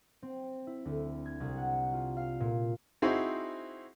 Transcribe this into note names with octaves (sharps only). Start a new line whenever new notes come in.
C4
E4
D2
G#6
C2
F#5
F4
F5
A#2
C4 D#4 E4 F#4 G#4 C5